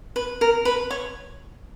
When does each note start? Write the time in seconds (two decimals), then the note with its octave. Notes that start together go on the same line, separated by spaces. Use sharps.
0.16 B4
0.41 A#4
0.65 B4
0.91 C#5